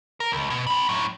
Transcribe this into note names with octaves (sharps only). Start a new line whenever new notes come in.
A#4
C#2
B2
C4 B5
A2 F#3